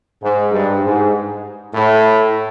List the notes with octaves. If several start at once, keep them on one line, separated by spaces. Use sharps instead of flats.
G#2
G2
G#2
A2